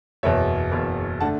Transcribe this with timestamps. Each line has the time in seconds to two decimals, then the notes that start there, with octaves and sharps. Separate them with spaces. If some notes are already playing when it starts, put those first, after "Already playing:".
0.23 F#1 E2 B2 C#5 E5
0.72 F#1 E2 B2
1.21 D3 A3 D4 F#5 A5